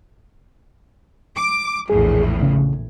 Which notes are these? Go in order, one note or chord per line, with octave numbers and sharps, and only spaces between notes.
D6
A#1 E2 A2 G#4
C#3